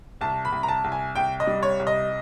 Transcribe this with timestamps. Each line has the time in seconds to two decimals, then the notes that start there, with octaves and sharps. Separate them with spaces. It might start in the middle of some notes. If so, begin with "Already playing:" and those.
0.21 C2 A5
0.45 B5
0.52 C2
0.63 A#5
0.68 A5
0.84 C2
0.92 G#5
1.15 C2 G5
1.40 D#5
1.47 G3
1.63 C#5
1.80 C2
1.87 D#5